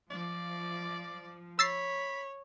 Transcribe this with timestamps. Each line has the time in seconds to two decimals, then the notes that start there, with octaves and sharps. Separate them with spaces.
0.11 F3 D5
1.59 C#5 B5 E6 A6 C7